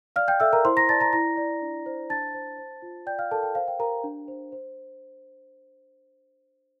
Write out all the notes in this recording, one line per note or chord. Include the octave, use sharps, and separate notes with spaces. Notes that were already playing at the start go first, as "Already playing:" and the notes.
D5 F5 F6
G5 G6
A4 E5 E6
A#4 A#5
E4 C5 C6
A#5 A#6
D5 A5 A6
A#5 A#6
E4 A#5 A#6
D5
D4
C5
D4 A5 A6
C5
C5
F4
D5 G5 G6
F5 F6
A4 A#4 A5
G5
C5 F5
G5
G4 A#4 A#5
D4
C5
C5